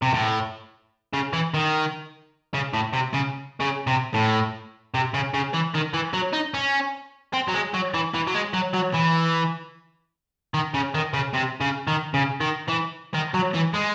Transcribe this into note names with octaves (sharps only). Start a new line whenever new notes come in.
C3
A2
C#3
E3
D#3
C#3
A2
C3
C#3
C#3
C3
A2
C3
C#3
C#3
E3
D#3
E3
F#3
D#4
C#4
C4
F#3
G#3
F#3
E3
E3
F#3
G#3
F#3
F#3
E3
D#3
C#3
D#3
C#3
C3
C#3
D#3
C#3
D#3
E3
D#3
F#3
E3
G#3